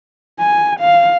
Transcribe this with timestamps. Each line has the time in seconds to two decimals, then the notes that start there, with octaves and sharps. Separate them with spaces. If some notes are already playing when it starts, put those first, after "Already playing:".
0.39 G#5
0.80 F5